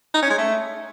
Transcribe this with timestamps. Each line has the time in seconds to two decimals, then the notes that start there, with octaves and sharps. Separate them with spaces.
0.14 D#4
0.22 C#4
0.30 G#3
0.38 A3